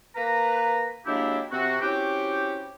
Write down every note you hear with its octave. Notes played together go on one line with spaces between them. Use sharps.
A#3 B4 A#5
F#3 G#3 A#3 D4 E4 G4
C3 C4 F#4
C4 C#4 E4 F#4 G4